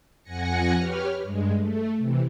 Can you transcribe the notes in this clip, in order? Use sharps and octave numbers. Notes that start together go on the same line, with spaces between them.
F2 F#5 G#5 A#6 C#7
G4 B4 C#5 F6
G2 G#3
A3
C3 E3